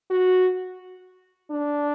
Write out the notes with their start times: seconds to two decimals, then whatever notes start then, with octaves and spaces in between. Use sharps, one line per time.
0.11 F#4
1.51 D4